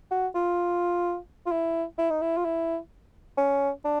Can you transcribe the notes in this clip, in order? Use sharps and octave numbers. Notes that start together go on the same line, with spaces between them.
F#4
F4
F4
E4
E4
D#4
E4
F4
E4
C#4
D4